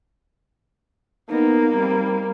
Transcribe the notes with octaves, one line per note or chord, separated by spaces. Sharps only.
A#3 B3 D#4
G3 C4